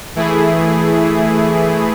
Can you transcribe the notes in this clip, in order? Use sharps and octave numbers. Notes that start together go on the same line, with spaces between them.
E3 A3 E4 G#4